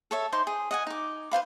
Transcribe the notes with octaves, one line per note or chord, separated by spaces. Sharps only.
A4 C#5 E5
D#4 C5 C6 D6
G#4
D#5 F#5 G#5
D#4 D6
B4 C5 F5 B5